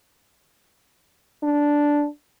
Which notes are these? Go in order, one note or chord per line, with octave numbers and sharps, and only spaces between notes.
D4